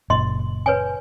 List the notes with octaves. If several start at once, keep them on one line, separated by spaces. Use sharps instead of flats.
F#1 A#2 D#5 C6
B4 C#5 G#5